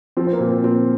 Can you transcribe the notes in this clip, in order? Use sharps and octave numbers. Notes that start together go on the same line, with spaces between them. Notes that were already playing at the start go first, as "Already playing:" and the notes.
F3 C4
C4
A#3
A#2
C4
A#2 C4